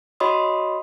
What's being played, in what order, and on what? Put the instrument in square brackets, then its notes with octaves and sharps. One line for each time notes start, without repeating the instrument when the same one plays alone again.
[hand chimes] F#4 C#5 D#5 B5 C6 D#6